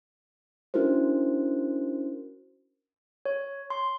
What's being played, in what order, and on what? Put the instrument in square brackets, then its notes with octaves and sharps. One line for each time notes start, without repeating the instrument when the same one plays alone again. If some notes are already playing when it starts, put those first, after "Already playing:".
[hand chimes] C#4 D4 E4 F#4 A#4 C5
[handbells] C#5
C6